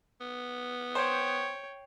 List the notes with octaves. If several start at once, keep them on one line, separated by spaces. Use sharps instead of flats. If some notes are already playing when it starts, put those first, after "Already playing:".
B3
C5 C#5 G5